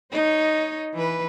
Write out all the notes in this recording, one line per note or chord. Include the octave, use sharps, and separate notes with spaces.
D#4 C#5 D#5
E3 B4